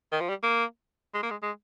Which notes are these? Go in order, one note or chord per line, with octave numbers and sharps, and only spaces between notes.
D#3
F3
G3
A#3
G#3
A#3
G#3
G#3